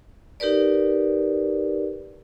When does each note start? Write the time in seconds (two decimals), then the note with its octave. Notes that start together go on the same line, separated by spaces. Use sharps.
0.40 D#4 G4 A#4 B4 D5